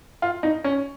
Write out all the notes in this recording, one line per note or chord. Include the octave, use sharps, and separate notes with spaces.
F4
D#4
C#4